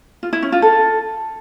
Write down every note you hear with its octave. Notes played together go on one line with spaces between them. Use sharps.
F4
E4
C#4
F4
A4